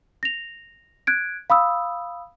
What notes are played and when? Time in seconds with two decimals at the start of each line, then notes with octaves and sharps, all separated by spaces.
0.23 A#6 F7
1.07 F#6 G#6 D7
1.50 F5 B5 D#6 E6